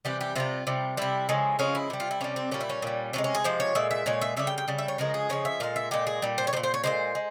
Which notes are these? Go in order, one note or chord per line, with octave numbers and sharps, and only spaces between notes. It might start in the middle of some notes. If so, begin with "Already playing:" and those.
C3 E3 G3 G4
G4
C3 E3 G3 F4
C3 G3
C3 G3 E4
C#3 F3 G#3
C#3 F3 G#3 C#4
E4
C3 G3
F4
E4
C3 G3 C#4
C4
A#2 G3 C#4
E4
C#4
A#2 G3
C3 F3 G#3 C#4
C#4
G#4
C3 F3 G#3 C5
C#5
A#2 G#3 E5
E5
A#2 G#3 C#5
E5
C#3 G3 E5
G5
G5
C#3 G3
E5
C#5
C#3 F3 G#3 A#4
G#4
C#3 F3 G#3 C#5
E5
A#2 G#3 F5
E5
A#2 G#3 G4
G#4
A#2 G3
C5
C#5
G3 C5
A#2
C5
C#5
A#2 F3 G#3 C5
G#3